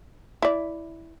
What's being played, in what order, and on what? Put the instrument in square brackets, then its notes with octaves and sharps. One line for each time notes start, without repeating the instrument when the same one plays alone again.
[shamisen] E4 D5